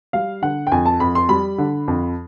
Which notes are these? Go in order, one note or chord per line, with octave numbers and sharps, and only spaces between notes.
G3 F5
D3 F#5
G5
F2 G#5
A5
F2 B5
C6
G3 B5
D3
F2